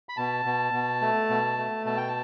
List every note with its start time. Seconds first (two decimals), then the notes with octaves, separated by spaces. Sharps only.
0.09 B5
0.17 B2 A5
0.45 B2
0.73 B2
1.02 A3
1.30 B2
1.58 A3
1.85 B2 A5
1.97 G5
2.08 A5